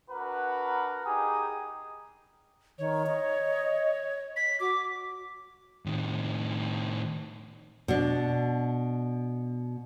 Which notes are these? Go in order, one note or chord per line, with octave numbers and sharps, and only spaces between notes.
D4 F#4 A#4 B4 F#5
D#4 G4 G#4 G#5 D#6
D#3 C#5
D#5
B6
F#4 D6
A2 D#3
B2 D4